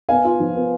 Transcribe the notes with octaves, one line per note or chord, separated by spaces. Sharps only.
B3 F5 G#5
F4
F3
B3